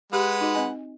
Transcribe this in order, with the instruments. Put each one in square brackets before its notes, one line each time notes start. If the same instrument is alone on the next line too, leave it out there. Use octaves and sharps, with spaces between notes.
[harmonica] G#3 B4 F#5 [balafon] G4
[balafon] D#4 F#4 D#5
C4 D#5 G#5